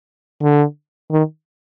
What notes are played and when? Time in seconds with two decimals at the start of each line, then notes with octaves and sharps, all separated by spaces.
0.42 D3
1.11 D#3